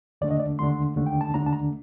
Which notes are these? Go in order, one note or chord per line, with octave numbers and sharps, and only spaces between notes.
D#2 D3 A3 D4 D5
D#5
D5
D#2 D3 A3 D4 C6
D#2 D3 A3 D4
G5
A5
D#2 D3 A3 D4 A#5
A5
A#5